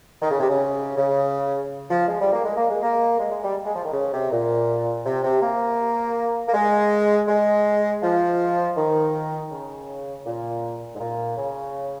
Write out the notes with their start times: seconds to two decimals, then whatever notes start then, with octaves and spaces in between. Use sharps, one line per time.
0.22 D#3
0.31 C#3
0.40 C3
0.50 C#3
0.97 C#3
1.90 F3
2.08 G#3
2.21 G3
2.33 A#3
2.45 G#3
2.57 A#3
2.70 G#3
2.83 A#3
3.20 G#3
3.32 G#3
3.44 G3
3.66 G#3
3.76 F3
3.85 D#3
3.93 C#3
4.13 C3
4.31 A#2
5.06 C3
5.24 C3
5.42 A#3
6.49 A#3
6.54 G#3
7.28 G#3
8.03 F3
8.77 D#3
9.52 C#3
10.26 A#2
10.95 G#2
11.00 A#2
11.37 C#3